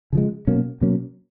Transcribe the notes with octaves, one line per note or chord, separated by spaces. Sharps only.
C#3 F3 G#3
B2 F#3 A#3 C#4
B2 F#3 A#3 C#4